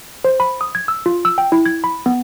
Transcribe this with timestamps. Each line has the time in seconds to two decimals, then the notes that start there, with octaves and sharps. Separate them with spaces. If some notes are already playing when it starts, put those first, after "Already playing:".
0.24 C5
0.40 B5
0.61 D#6
0.75 G#6
0.88 E6
1.06 F4
1.25 E6
1.38 G5
1.52 E4
1.66 G#6
1.84 B5
2.06 B3